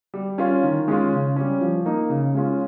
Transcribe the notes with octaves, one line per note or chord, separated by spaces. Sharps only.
G3
C#4 F4
D#3
G#3 C#4 F4
C#3
G3 C#4
F3
A#3 D#4
C#3
G#3 C#4 F4